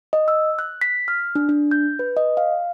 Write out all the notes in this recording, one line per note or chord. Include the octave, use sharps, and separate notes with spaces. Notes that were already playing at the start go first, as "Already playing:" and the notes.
D#5
E6
F#6
B6
F6
D4
D4
G6
B4
D#5
F5